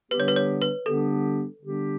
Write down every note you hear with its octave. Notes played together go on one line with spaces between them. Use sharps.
D3 G3 B3 D4 G4 B4
C#5
B4
C#5
B4
D3 G3 B3 D4 G4 A4
D3 G3 B3 D4 G4